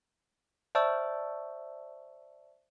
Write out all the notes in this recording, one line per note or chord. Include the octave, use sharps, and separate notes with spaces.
C5 D5 E5 A5 C#6 E6